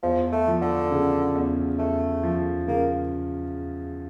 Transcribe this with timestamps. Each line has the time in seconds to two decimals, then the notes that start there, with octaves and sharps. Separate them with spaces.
0.03 E2 F3
0.32 A3
0.48 F3
0.62 D3
0.91 C#3
1.35 E2
1.79 E2 A3
2.23 F3
2.67 C#3 A#3